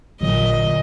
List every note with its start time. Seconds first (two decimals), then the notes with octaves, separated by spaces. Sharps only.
0.21 A1 A#2 D3 F#3 D#5